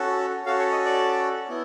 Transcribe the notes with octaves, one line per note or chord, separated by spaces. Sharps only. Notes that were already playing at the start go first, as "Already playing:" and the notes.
Already playing: C#4 F#4 A4
C#4 F#4 A4 F5
C#5
D#5
D5
B3 E4